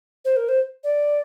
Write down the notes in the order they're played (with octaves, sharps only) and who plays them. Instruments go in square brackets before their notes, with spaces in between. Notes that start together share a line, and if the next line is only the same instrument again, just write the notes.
[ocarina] C5
A#4
C5
D5